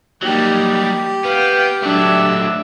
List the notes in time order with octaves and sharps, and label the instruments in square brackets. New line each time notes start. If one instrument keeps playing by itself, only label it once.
[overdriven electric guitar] F#3 G3 [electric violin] A#3 D#4 [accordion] G4
[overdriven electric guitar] B3 [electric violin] F5 G5
[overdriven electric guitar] F#3 A3 [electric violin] D4 E5